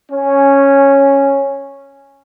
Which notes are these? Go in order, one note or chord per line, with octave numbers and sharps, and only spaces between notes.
C#4